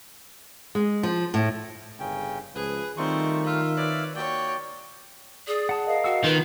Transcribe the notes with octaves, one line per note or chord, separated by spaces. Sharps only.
G#3
F3
A2
G1 C#3 C#4 G5
C#2 F3 G#4 B4
D#3 G3 A3 C4 D#4 F4 C5 C#6
F4 E5 F5
B4 C#5 D5
A#3 F#4 C#5 D5 G5
G#4 D5 D#6
F#5 A5
A#4 D#5 F5
F#4 F#5 E6
D#3 B3 F4 B4